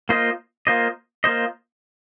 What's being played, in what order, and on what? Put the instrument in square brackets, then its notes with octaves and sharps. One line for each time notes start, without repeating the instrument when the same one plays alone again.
[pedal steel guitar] A#3 F4 C5 D#5
A#3 F4 C5 D#5
A#3 F4 C5 D#5